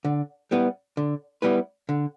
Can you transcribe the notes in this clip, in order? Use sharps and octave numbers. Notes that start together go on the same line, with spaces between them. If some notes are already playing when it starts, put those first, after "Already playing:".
D3
G3 B3 E4 B4
D3
G3 B3 E4 B4
D3